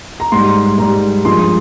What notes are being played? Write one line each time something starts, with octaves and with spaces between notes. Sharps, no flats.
A#5
G#2 G3 C6
G#2 G3 A#5
G2 F3 G#3 C6